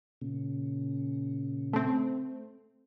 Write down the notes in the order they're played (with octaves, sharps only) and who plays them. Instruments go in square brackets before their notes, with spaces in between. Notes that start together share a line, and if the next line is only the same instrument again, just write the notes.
[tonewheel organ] A#2 C#3
[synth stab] A3 C4